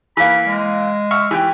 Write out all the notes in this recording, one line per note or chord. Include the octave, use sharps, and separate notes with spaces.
E3 A#3 B5
G#3
E5 C#6 F6
E3 G4